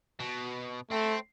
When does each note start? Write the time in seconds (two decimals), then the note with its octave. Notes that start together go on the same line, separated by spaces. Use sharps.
0.20 B2
0.91 A3 C4